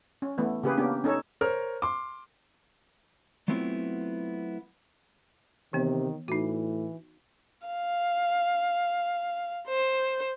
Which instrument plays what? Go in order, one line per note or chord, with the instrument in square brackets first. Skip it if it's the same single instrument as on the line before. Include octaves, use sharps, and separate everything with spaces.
[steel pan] C#4
E3 A3 B3
C#3 A#3 G4 G#4 B4
A#3 B3 C#4 D4 G4
C#4 D#4 A4 C#5
[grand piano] A#4 C5 C#5 F6
C6 D6
[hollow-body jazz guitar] F#3 A3 B3 C4 E4 F4
[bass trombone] C3 [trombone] D#3 [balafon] E3 B3
[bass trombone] A2 [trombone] E3 [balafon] D#4 F#4
[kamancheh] F5
C5